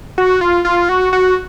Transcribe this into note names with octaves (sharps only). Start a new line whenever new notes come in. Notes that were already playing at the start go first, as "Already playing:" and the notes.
F#4
F4
F4
F#4
F#4